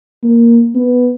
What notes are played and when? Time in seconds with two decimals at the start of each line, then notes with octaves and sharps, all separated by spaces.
0.24 A#3
0.75 B3